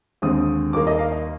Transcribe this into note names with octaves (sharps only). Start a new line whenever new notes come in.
D#2 D3 G#3 C4 D#6
D#2 D#3 G3 A#3 D6
D#5
F5
D#5